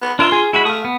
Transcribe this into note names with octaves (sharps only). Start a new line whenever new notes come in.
B3
D4 F4 A#4 E5
G#4
G#3 E4 F#4 B5
A3 F5 D#6
B3